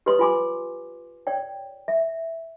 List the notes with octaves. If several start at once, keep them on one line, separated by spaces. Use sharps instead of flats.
G4 B4 C#5 D#5 C6 D#6
F4 G4 G#5 C6 D6
C#5 D5 G5
E5